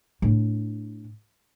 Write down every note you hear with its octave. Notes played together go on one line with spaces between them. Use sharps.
A2 D4